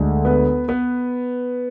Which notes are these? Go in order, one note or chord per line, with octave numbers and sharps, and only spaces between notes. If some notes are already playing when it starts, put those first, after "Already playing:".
Already playing: D2 D3 G#3
B3 B4
B3 B4